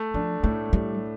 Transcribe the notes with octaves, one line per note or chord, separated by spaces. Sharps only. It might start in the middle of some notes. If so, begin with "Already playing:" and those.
Already playing: A3
F3 D4
A2 A3
A2 G3